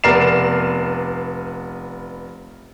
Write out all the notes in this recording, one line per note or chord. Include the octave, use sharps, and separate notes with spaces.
F1 B3 A#4 D5 C7 E7